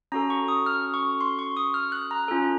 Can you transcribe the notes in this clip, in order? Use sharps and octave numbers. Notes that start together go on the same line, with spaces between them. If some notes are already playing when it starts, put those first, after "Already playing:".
C#4 F#4 A4 A#5
C#6
D#6
F6
C#6
C6
C#6
D#6
F6
F#6
A#5
C#4 F4 A4